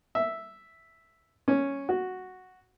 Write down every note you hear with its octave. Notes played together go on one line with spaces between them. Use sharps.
E5
C#4
F#4